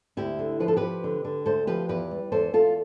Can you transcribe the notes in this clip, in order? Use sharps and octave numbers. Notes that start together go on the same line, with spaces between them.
D2 E4 G4
D3
F3 B4
A4
F3 G4 B4
D3
D3
D2 A4 C5
F3 G4 B4
E2 G4 B4
G3
E2 A4 C5
E2 F4 A4